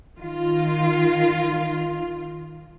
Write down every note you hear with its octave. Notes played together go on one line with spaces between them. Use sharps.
D#3 F4